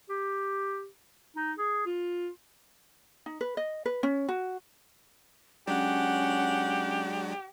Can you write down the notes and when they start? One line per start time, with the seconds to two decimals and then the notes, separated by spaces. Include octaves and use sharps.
0.09 G4
1.36 D#4
1.58 G#4
1.86 F4
3.26 D#4
3.41 B4
3.57 D#5
3.85 B4
4.03 C#4
4.29 F#4
5.67 F#3 G#3 C#4 D4 G4 F#5